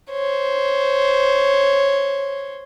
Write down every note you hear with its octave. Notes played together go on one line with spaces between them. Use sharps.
C5 C#5